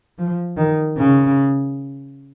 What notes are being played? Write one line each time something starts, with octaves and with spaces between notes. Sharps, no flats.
F3
D#3
C#3